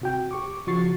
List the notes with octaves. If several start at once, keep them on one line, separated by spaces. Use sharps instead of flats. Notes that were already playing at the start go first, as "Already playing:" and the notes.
C3 F#4 G5
G4 C#6 D6
C#3 F3 F#4 C#6 A6 C7